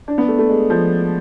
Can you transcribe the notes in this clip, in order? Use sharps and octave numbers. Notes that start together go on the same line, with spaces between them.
D4
B3
A3
A3
G#3
F3